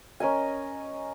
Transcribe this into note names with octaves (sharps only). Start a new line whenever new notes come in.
C#4 A#4 D#5 G#5